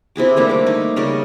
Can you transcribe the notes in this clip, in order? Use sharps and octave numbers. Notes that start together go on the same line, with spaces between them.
C3 E4 G#4 D6
D3 G3 A3 A#3
D3 D6
D#4
C#3 G3 A#4 D5